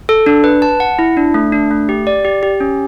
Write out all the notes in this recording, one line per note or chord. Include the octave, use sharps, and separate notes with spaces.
A4
D4
B4
A5
F#5
E4
D4
A3
D4
A3
G4
D5
G4
G4
C#4